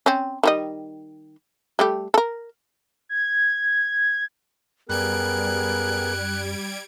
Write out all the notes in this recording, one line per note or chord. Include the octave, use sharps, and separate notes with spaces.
C4 C#4
D#3 G3 D#5
G3 A3 G4
A4 A#4
G#6
F#2 G3 B3 G#4 A#4 F#6 G#6 D7